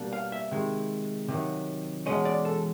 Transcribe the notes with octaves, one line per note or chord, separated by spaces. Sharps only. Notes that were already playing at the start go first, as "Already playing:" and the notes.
Already playing: B2 G3 A#3 D4
F5
E5
C3 D#3 G#3
C3 D#3 F#3
E2 B2 G#3 C#4 D#5
D5
A4